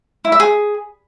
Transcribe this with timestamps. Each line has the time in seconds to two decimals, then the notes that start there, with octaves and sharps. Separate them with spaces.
0.25 E4
0.32 E5
0.40 G#4